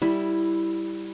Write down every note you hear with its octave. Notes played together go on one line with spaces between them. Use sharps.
G3 E4